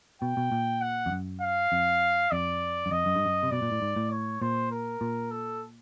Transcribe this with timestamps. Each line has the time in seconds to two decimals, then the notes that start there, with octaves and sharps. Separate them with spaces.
0.22 B2 G5
0.37 B2
0.52 A#2
0.81 F#5
1.06 F2
1.12 F#2
1.42 F5
1.72 F2
2.31 F2 D5
2.86 F#2
2.91 F2 D#5
3.06 F#2
3.15 G2
3.25 F#2
3.43 C3
3.51 B2 D5
3.62 A#2
3.72 A2
3.82 G#2
3.96 A2
4.11 C#5
4.41 A#2 C5
4.71 A#4
5.01 A#2
5.31 A4